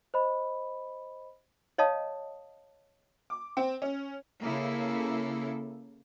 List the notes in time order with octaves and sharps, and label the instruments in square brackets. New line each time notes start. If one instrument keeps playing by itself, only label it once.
[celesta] C5 D#5 B5
[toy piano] C#5 D#5 F5 A5 D#6
[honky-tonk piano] D6
C4
C#4
[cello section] C#3 A#3 E4 A4